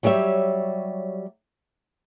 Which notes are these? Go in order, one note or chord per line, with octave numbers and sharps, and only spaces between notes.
F#3 G3 G4 C#5 E5